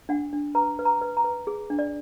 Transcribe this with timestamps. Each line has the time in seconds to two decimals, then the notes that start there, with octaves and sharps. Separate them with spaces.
0.09 D4 F#5
0.33 D4
0.55 B4 A#5
0.79 B4
0.85 A#5
1.01 B4
1.17 A#5
1.24 B4
1.47 G#4
1.70 D4
1.79 D5